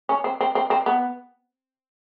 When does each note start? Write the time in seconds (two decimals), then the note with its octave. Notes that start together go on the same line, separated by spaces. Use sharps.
0.09 C#4
0.24 C4
0.41 C4
0.55 C4
0.70 C4
0.86 B3